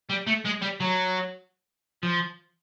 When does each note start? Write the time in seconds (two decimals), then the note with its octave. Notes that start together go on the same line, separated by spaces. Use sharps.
0.09 G3
0.27 A3
0.45 G#3
0.62 G3
0.80 F#3
2.03 F3